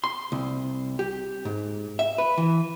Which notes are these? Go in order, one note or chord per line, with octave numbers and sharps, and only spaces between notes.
C6
C2
G4
G#2
E5
B4
E3